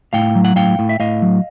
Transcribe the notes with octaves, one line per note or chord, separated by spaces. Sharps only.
A2 F5 G5
F#3
F#5
A2 F5 G5
A2
E5
A2 D#5 F5
F#3